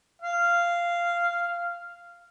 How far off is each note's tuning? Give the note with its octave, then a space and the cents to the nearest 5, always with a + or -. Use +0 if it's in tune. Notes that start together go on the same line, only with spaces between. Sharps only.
F5 -10